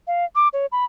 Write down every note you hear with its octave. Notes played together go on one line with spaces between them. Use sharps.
F5
D6
C#5
B5